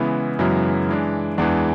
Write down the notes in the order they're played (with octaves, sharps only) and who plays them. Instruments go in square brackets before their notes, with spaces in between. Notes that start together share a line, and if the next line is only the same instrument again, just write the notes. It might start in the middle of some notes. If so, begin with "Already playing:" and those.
Already playing: [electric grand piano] C#3 E3 G#3 B3 E4
[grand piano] F#2 [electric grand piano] C#3 E3 G#3 B3 E4
[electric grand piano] E3 G#3 D4
[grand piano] E2 [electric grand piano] E3 G#3 D4